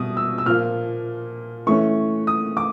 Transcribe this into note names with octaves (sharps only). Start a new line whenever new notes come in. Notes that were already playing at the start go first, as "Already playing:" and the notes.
Already playing: B2 G3 D#6
E6
E6
A#2 F3 A#3 F6
E3 A3 C#4 C#6
D#6
D6